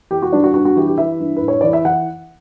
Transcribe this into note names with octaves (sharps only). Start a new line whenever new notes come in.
E3 G4
F#4
G2 D4
F#4
G2 F#4
F#4
E3 G4
G4
E3 E5
G2
A2 B4
C#5
E3 D5
E5
E3 F#5